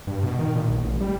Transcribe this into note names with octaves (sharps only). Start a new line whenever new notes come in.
G2
B2
D#3
A#2
B1
A1
G3